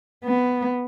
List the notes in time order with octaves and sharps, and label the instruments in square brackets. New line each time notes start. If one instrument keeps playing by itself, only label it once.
[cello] B3